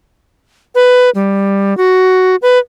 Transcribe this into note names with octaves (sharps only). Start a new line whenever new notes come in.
B4
G3
F#4
B4